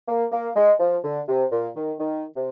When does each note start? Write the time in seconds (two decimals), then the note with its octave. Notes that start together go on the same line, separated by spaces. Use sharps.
0.08 A#3
0.32 A#3
0.56 G#3
0.80 F3
1.04 D3
1.28 C3
1.52 A#2
1.76 D#3
1.99 D#3
2.36 C3